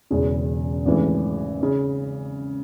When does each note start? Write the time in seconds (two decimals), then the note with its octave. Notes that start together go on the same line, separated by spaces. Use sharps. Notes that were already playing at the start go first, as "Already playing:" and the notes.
0.11 E1 E2 C#3
0.85 G#1 F#2 C#3 E3 A3
1.63 C#3